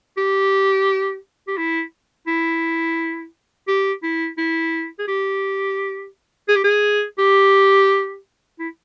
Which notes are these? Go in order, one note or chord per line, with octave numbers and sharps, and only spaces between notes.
G4
G4
E4
E4
G4
E4
E4
G#4
G4
G#4
G4
G#4
G4
E4